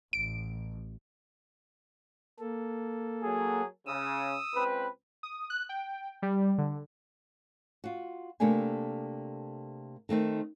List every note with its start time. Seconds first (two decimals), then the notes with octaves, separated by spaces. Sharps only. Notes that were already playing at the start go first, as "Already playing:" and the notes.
0.13 A1 D7
2.39 A#3 A4
3.23 F#3 G#4
3.87 C#3 D#6 E6
4.54 C#2 C4 B4
5.23 D#6
5.50 F#6
5.69 G5
6.22 G3
6.58 D3
7.84 F4 F#4
8.40 C3 A3 A#3 D4 A4 G#5
10.09 D#3 A3 C4 D#4